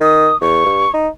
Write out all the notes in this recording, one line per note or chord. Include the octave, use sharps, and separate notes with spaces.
D#3 D#6
E2 C#6
G2
D#4